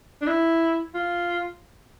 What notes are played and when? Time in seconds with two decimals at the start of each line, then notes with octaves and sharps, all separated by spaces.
0.22 D4
0.27 E4
0.94 F4